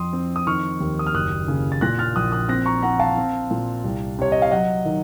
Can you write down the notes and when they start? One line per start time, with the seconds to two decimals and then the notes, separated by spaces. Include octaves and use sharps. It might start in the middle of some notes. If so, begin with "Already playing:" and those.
Already playing: F2 C6 D#6
0.13 C4
0.36 D#6
0.47 D#3 C#6 F6
0.80 D#2
0.99 D#6
1.07 F6
1.14 F#1 D#6 F#6
1.48 C#3
1.72 A6
1.81 A#2 F#6 A#6
1.99 F6 A6
2.16 A#1 D#6 F#6
2.32 D#6 F#6
2.49 C4 F#6 A#6
2.66 A#5 C#6
2.82 C4 F#5 A#5
3.00 F5 A5
3.17 C4
3.51 A#2
3.84 C2
4.19 C3 C#5
4.32 D#5
4.42 F5
4.51 F#3 D#5 F#5
4.85 D#3